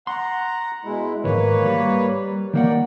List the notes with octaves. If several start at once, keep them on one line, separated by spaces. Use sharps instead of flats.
F#5 A#5 C6
B2 G#3 E4
B1 G#2 D#3 A#3 B4 C#5
G3
D#3 A#3 A#4 D5 F#5 G5